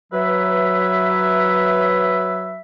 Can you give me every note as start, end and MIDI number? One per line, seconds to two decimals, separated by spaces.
0.13 2.61 54
0.13 2.61 71
0.13 2.61 76